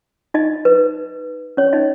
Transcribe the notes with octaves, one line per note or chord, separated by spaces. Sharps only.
D#4 D#5
B4
C#4 C#5
D#4 D#5